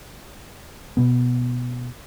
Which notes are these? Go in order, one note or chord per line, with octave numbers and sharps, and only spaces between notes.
B2 B3